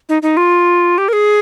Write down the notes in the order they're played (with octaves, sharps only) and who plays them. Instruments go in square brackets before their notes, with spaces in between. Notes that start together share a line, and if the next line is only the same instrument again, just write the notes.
[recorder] D#4
D#4
F4
G4
A#4
G#4